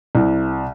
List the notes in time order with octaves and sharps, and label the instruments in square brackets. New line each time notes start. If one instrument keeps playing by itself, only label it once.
[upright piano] C2